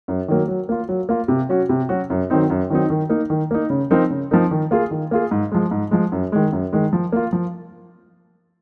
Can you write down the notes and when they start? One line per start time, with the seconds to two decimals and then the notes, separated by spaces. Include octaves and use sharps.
0.08 F#2
0.28 D#3 F#3 A#3
0.48 F#3
0.69 A#3 F4
0.89 F#3
1.09 A#3 F4
1.28 C3
1.49 F#3 C#4 F#4
1.69 C3
1.89 F#3 C#4 F#4
2.10 F#2
2.30 D#3 F#3 C4 D#4
2.50 F#2
2.70 D#3 F#3 C4 D#4
2.90 D#3
3.09 A#3 D#4
3.30 D#3
3.51 A#3 D#4
3.70 C#3
3.91 F3 C4 D#4 A#4
4.10 C#3
4.31 F3 C4 D#4 A#4
4.51 D#3
4.71 A#3 F4 G#4
4.91 D#3
5.11 A#3 F4 G#4
5.31 G#2
5.52 F3 G#3
5.71 G#2
5.91 F3 G#3
6.12 F#2
6.32 D#3 G#3
6.52 F#2
6.73 D#3 G#3
6.93 F3
7.12 A#3 F4
7.33 F3